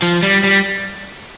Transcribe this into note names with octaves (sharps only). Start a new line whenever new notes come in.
F3
G3
G3